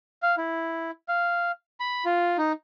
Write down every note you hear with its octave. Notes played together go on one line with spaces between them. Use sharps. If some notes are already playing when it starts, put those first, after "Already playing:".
F5
E4
F5
B5
F4
D#4